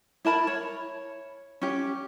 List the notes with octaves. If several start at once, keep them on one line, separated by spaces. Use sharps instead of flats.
E4 A#4 A5 B5
C#5
C#4 G4